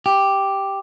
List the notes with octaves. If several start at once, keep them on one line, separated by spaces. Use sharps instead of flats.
G4